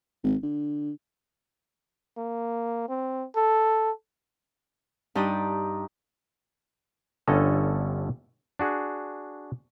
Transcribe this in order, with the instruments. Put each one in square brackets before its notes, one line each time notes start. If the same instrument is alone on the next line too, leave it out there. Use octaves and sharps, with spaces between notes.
[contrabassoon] G#1
D3
[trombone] A#3
C4
A4
[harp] G2 D4 D#4 G4 D#6
[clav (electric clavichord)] G1 D3 G3 C#4 A4 D#5
D4 F#4 G#4